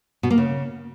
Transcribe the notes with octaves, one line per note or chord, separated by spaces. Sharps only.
B2
A#3
C#3